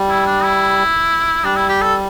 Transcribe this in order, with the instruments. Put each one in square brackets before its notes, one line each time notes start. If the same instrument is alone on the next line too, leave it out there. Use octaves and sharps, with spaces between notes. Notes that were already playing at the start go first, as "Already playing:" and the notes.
Already playing: [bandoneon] G3
[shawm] E4
D4
E4
[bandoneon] G3 [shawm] D4
[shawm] E4
G4
A4